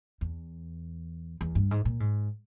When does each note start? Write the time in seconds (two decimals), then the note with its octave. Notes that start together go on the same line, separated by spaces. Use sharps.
0.21 E2
1.41 E2
1.55 G2
1.71 G#2
1.85 A#2
2.00 G#2